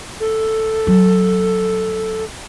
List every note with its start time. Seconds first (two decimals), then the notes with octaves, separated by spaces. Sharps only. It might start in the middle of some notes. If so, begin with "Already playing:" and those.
0.20 A4
0.87 F#3